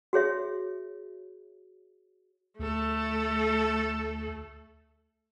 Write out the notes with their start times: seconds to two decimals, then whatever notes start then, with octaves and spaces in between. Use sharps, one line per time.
0.13 F#4 G#4 C#5 E5
2.59 D2 A3 A4